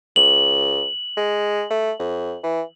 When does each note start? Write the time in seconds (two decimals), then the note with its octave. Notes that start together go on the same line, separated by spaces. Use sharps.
0.16 C#2 F#7
1.17 G#3
1.70 A3
1.99 F2
2.43 E3